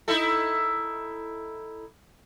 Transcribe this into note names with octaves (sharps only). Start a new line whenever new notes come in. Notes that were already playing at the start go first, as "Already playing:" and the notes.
D#4 E4 A4